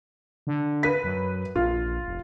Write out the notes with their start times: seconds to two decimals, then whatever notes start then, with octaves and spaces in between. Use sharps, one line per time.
0.47 D3
0.83 B4 B6
1.04 F#2
1.56 A#1 F4
2.06 F1